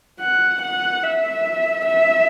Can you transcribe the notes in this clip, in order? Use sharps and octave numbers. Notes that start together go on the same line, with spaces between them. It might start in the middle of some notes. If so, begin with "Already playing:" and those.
F#5
F#5
E5
E5